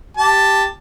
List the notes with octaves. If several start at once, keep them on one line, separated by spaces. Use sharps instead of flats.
G4 A5